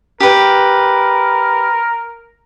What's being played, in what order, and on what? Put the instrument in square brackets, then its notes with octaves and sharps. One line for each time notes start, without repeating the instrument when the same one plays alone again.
[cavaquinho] G4 B4 [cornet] A#4